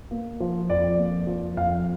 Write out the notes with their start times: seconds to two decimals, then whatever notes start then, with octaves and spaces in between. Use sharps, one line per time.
0.11 A#3
0.40 F3
0.70 F2 D5
0.98 A#3
1.27 F3
1.57 F2 F5